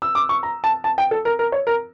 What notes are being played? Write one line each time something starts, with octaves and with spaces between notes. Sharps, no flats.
E6
D6
C#6
A#5
A5
A5
G5
A4
A#4
A#4
C#5
A#4